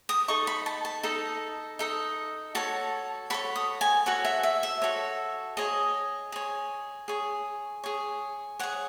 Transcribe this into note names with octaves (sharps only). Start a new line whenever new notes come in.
D#6
D#4 A4 D#5 C#6
B5
A5
A5
D#4 A4 D#5
D#4 A4 D#5
F#4 A4 C#5 A5
F#4 A4 C#5 B5
D#6
G#5
F#4 A4 C#5 F#5
E5
E5
E5
F#4 A4 C#5
G#4 C#5 D#5
G#4 C#5
G#4 C#5
G#4 C#5
G#4 C#5 F#5